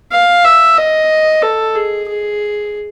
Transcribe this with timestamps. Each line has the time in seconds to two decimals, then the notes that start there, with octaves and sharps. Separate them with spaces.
0.12 F5
0.44 E5
0.77 D#5
1.42 A4
1.75 G#4
2.09 G#4